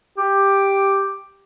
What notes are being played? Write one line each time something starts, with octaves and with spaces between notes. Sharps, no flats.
G4